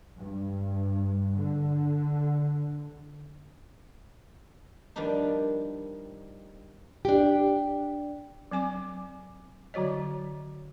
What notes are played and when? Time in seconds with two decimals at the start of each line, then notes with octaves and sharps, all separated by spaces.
0.17 G2
1.36 D3
4.96 D#3 F3 G3 D4 D#4
7.05 D4 G4
8.51 F#3 C4 G#5 D6
9.74 D3 F#3 F#4 C#5 D#5